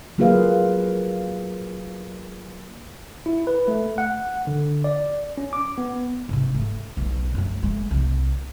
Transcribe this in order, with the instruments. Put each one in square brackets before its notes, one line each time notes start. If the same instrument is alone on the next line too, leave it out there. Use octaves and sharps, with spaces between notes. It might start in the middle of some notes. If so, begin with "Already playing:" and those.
[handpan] F#3 A#3 F4 G#4 B4 F5
[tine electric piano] E4
B4
A3
F#5
D3
D5
C#4
D6
B3
[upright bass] G#2 C3
A3
B1
F#2 A3
G#3 A3
C2